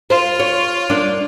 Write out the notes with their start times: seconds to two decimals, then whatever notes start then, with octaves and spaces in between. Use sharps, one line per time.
0.10 F4 C5
0.40 C#5
0.90 A#3 D4